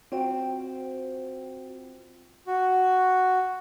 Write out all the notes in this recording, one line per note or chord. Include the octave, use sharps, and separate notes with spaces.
C4 F4 F#4 G5
F#4